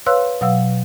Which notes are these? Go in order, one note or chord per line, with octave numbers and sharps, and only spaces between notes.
B4 C#5 F5 C6 E6 F#6
B2 F#3 F5 F#5 E6